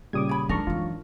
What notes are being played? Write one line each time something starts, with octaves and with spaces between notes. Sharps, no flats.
A#2 C#3 G3 D6 D#6 G#6
C#5 B5
F3 G#3 D4 D#4 A#4 C#6
F#2 E3 F4